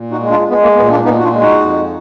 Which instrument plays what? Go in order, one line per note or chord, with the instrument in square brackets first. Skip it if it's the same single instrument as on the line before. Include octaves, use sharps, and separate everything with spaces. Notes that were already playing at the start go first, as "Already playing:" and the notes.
Already playing: [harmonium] A#2
D#4 F#4
G#3
D4 F4
G#3 B3
A#3
A#2 B3
A#3 D4
A#2 B3 D#4
F#4
D4 F4
G#3
D#4 F#4
F2